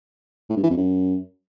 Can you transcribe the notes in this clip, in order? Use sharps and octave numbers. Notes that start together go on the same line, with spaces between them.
A2
G2
E3
F2
F#2